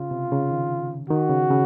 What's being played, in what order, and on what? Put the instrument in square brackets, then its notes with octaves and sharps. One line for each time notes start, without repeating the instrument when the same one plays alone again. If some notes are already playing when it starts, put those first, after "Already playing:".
Already playing: [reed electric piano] C#3 [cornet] F4
[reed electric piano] C3
C#3
D#3
[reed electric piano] D#3 [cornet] F#4
[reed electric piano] C#3
C#3